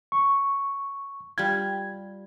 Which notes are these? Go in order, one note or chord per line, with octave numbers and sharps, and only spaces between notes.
C#6
G3 F4 G#6